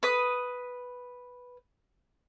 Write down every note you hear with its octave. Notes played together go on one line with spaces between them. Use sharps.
B4 D#6